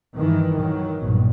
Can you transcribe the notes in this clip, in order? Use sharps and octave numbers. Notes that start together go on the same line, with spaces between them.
G2 D#3 E3
D#3 F#3
A#1 G2 B2